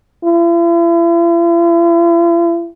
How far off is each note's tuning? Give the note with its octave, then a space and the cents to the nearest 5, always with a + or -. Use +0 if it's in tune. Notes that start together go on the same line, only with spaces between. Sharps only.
E4 +45